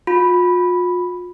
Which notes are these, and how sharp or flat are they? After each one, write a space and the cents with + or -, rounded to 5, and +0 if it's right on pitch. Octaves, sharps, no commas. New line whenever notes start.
F4 +40 B5 +0